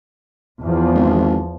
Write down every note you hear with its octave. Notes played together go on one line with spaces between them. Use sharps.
E2 F3
G#1